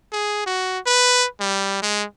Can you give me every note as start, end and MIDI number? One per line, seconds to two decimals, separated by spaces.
0.12 0.43 68
0.46 0.79 66
0.86 1.26 71
1.40 1.78 55
1.82 2.05 56